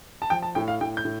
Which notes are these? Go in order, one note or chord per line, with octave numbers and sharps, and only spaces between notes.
A5
F3 G5
A5
A2 G5
F5
A2 G5
G6
A2